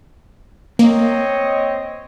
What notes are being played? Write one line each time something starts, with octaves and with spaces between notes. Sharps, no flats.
A#3 C4 C#5 D#5